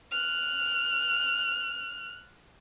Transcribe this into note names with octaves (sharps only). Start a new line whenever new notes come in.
F6 F#6